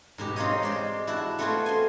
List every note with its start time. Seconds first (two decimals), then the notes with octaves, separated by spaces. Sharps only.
0.18 G#2 B2 G4
0.36 C4 D#4 F4 C#5 D#5
0.63 G#3 D5 C6
1.07 E4 F#4 A5
1.39 A3 B3 C4 F4 F#4 G#4
1.66 G#5 C6